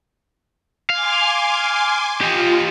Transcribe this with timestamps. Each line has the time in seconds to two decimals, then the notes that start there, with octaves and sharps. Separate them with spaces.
0.90 F5 G#5 C6 D6
2.21 F4 G4 D#5